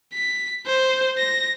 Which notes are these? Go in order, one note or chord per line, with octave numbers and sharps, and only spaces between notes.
B6
C5
A#6